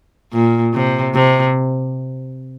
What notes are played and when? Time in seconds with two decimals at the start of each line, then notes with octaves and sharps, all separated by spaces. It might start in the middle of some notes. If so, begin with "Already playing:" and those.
0.33 A#2
0.74 C3
1.14 C3